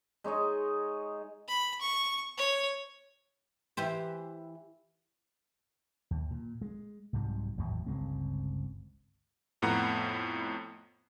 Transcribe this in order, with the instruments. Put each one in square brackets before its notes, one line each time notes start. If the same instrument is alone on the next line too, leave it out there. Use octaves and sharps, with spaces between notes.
[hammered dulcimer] G#3 D#4 C#5 D#5
[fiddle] B5
C#6
C#5
[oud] E3 G4 C5
[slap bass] D#2
A#2
G#3
C2 G#2 C3 F#3
G#1 E2 A2 F#3
G1 C#2 G#3 C4
[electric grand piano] F2 A2 B3 F#5 A#5